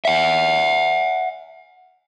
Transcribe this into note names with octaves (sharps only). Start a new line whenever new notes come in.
E5 F#5